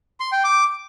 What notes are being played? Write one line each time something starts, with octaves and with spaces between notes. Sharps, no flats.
C6
G5
D6